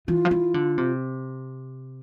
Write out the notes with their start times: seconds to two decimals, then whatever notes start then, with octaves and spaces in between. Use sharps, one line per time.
0.08 E3 F4
0.25 F3
0.31 E3
0.54 D3
0.78 C3